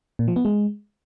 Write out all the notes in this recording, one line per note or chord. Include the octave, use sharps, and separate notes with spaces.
A#2
F3
B3
G#3